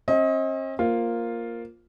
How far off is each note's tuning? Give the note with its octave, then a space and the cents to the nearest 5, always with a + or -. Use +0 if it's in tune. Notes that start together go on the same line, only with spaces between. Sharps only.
C4 +45 D#5 +30
A#3 +0 F4 +0 C5 +0